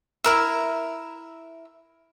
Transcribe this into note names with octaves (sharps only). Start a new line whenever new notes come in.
E4 A#4 E5